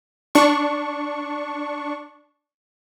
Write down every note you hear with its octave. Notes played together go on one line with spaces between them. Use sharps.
D4 C#6